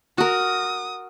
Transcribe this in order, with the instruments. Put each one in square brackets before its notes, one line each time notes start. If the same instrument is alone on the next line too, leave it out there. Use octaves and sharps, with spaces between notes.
[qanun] F#4 A#4 [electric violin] D#6